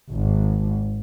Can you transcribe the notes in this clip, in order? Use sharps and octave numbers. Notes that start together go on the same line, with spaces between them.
G#1